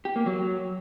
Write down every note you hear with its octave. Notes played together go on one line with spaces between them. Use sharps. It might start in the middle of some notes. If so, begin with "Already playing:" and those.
G4
A#3
F#3